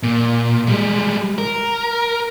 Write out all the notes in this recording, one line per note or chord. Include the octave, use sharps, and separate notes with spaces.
A#2
G3 G#3
A#4